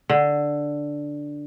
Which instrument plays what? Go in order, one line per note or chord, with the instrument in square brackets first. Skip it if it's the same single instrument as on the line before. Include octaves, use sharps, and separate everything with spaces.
[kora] D3